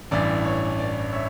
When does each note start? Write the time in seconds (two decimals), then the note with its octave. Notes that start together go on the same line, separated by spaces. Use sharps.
0.11 A1 G2 E3 D5
0.45 C#5
0.79 D5
1.13 C#5 E5